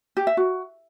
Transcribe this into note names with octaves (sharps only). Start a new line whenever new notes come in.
G4
E5
F#4